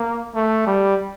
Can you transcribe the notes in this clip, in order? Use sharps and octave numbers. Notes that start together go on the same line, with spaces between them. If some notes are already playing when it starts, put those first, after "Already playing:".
Already playing: A#3
A3
G3